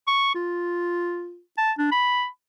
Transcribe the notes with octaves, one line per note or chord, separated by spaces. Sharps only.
C#6
F4
A5
D4
B5